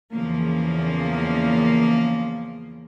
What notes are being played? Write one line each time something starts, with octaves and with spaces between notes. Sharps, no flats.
E2 C#3 F3 A#3